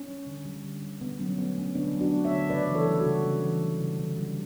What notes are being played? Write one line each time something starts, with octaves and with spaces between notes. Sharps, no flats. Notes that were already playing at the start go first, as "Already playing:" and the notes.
Already playing: C#4
G3
D3
G3
D3
G3
D3 B3
F#3 C#4
A3 B3
D3 C#4
D3 B3 D4
F#3
D4 F#4
A3
C#5 E5
D3
C#3 B4 D5
E3
A4 C#5
G3
F#4 A4
C#3
C#3
E3
G3
C#3
D3
G3